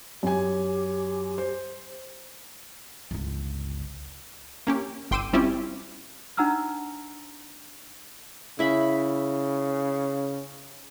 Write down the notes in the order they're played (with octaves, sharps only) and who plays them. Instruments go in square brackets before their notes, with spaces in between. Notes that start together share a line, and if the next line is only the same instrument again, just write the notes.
[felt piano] F#2 G#5 [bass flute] G4
[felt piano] C5
[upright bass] G1 C#2
[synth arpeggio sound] A#3 C#4 G4
G1 G5 C6 D6 E6 D#7
G3 C4 C#4 E4 F4 G4
[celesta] D4 D#4 F#5 A#5 E6 F6
[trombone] C#3 [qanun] E4 E5 B5